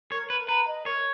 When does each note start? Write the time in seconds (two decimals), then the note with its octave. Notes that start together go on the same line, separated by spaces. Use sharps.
0.12 A#4 C#5
0.30 A#4 B4
0.48 B4 A#5
0.67 D#5
0.86 A#4 C#5